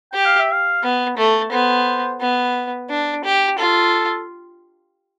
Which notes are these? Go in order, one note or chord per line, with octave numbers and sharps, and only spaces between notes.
G4 G5
F5
E5
F5
B3
A3
B3 C5
B3
D4
G4
F4 A4